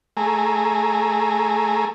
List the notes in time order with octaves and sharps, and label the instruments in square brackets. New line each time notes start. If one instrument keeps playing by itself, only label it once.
[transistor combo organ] A3 G#4 A#5